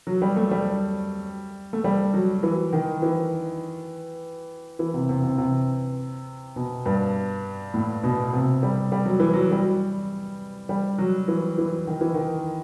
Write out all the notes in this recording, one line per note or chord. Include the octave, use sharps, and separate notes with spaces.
F#3
G3
A3
G3
A3
G3
F#3
E3
D#3
E3
E3
C3
C3
C3
C3
B2
G2
A2
B2
C3
G3
G3
F#3
E3
F#3
G3
G3
F#3
E3
E3
D#3
E3
D#3